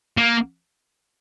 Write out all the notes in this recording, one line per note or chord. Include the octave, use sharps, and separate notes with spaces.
A#3